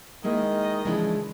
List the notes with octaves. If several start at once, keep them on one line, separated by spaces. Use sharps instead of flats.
D#3 G#3 A#3 E4 D#5
C#3 E3 F3 G#3 D4